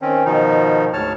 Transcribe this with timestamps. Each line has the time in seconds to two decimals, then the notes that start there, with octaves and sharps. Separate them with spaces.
0.02 D#3 C4 C#4
0.26 B2 D#3 F3 D#4
0.93 D2 G#2 C#5 A5 F6